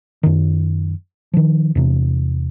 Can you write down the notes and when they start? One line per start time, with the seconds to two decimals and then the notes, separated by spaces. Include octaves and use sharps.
0.23 F#2 D#3
1.34 D#3 F3
1.75 E2 C3